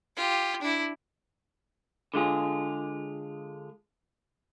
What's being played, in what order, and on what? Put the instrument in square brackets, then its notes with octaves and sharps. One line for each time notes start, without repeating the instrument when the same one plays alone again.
[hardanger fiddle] F4 G4
D4 E4
[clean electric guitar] D3 G#3 F4 G#4